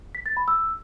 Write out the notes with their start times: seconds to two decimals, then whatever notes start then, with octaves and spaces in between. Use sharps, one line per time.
0.15 B6
0.26 A6
0.37 B5
0.48 E6